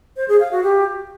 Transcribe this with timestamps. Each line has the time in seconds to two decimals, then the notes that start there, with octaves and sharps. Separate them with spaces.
0.16 C5
0.28 G#4
0.40 F5
0.52 F#4
0.63 G4